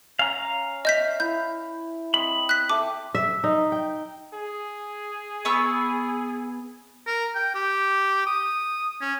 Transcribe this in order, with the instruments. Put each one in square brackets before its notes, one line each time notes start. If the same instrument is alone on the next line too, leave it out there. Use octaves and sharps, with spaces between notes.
[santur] C#4 [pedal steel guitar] F5 A#5
[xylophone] D#5 G6 B6 [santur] E5
[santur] E4 [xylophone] G6
[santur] C4 D#5 [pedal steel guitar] B5
[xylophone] F#6 B6
[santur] A4 E5 G5 [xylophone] D6
[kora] E5
D#4
G5
[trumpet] G#4
[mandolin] B3 C#6 E6
[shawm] A#4
G5
G4
D#6
C#4